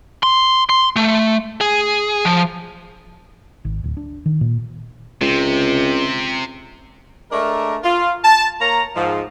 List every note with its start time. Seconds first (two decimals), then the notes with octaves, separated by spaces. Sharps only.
0.23 C6
0.69 C6
0.96 A3
1.61 G#4
2.25 F3
3.65 G#1
3.84 D1
3.97 D4
4.26 D#3
4.41 A#2
5.21 C#2 C3
7.32 G#3 A3 D4 A#4
7.83 F4
8.25 A5
8.61 A#3 A#4 C#5 A#5
8.96 G#2 F3